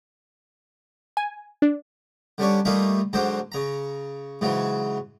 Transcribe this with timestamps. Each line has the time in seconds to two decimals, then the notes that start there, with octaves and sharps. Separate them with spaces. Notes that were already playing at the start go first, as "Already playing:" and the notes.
1.17 G#5
1.62 D4
2.38 D3 G3 C#4 D4 C#5
2.65 G3 A3 A#3 D#4 F4
3.13 G#2 D3 F#3 D4 C5
3.52 C#3 A#5
4.41 G#2 C#3 E3 F#3